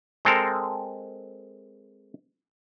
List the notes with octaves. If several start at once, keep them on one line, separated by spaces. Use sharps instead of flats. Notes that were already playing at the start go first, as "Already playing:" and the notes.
G#3 C4 A4 A#4